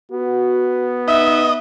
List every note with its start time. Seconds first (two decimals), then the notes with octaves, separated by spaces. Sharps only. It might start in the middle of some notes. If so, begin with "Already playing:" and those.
0.12 B3 F#4
1.08 D#4 D#5 E5